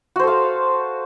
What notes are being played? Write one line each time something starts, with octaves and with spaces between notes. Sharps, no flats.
F#4 A4 C5 F5